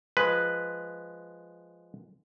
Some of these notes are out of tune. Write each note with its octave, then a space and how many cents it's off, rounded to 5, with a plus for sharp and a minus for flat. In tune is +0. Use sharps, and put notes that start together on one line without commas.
F3 +0 G#3 +0 B4 +0